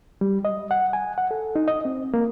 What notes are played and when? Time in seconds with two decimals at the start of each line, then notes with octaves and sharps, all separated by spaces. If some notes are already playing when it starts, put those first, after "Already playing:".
0.21 G3
0.45 D#5
0.71 F#5
0.93 G#5
1.18 F#5
1.31 A4
1.56 D#4
1.68 D#5
1.85 C4
2.14 A#3